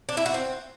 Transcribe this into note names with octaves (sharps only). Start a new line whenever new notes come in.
D4
E4
F#4
C4